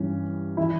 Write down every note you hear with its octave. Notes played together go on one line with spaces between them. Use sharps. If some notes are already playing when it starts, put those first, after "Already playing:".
Already playing: G2 E3 C#4
E3 E4